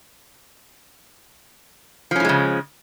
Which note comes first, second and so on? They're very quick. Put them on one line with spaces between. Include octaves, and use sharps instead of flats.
F3 C#4 A2 G#3 C#3